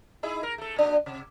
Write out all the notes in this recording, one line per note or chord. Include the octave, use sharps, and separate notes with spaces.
D#4 E4 G#4
A#4
A3 A4
A#2 D4 F#4
C3